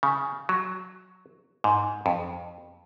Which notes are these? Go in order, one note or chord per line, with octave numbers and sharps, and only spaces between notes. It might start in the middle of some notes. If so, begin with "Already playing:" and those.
C#3
F#3
G#2
F2